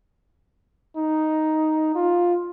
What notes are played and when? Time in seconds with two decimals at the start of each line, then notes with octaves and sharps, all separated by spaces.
0.96 D#4
1.95 F4